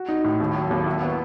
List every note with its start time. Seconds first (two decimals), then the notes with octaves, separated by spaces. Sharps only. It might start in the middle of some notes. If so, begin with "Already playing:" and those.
Already playing: F#4
0.09 D#4
0.24 A2
0.40 D#2
0.55 F#3
0.71 D#2
0.86 E4
1.02 B3